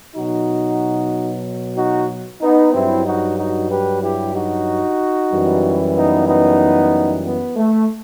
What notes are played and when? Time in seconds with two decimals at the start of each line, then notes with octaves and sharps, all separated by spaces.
0.16 B2 F#3 D#4 F#4
1.77 D#4 F#4
2.41 B3 D#4
2.74 G2 F#3 C4 E4
3.05 D#4 F#4
3.38 D#4 F#4
3.70 G4 B4
4.02 E4 G4
4.34 D#4 F#4
5.32 F#2 E3 G3
5.95 B3 D#4
6.28 B3 D#4
7.25 B3
7.57 A3